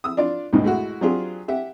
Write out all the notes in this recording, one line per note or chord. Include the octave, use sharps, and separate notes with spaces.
D#6 E6
D4 F4 D5
A#1 D#2 G#2 B2 D#3
G#3 A3 E4 F#4
F#3 C4 D4 F4 G4 G#4
G4 E5 F#5